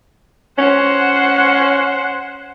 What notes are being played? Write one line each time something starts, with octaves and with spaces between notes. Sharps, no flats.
C#4 C5 F#5